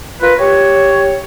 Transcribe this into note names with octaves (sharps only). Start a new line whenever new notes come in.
F4 A#4 B4
G4 C#5